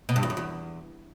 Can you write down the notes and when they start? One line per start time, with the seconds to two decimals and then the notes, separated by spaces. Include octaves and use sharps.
0.09 B2
0.16 G2
0.23 E2
0.30 F#2
0.37 E2